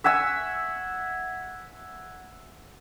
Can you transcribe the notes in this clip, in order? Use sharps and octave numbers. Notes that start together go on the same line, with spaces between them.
E5 F#5 G#5 E6